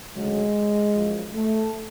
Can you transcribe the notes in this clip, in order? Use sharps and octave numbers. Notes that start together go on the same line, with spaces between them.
D2 C#3 F#3 G#3
F#2 F3
A3